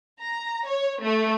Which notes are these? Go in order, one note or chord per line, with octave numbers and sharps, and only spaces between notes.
A#5
C#5
A3